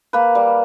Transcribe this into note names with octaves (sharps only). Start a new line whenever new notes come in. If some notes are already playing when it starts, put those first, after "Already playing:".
A#3 B4
G3